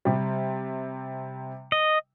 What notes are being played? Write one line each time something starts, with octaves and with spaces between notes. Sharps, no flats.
C3 G3
D#5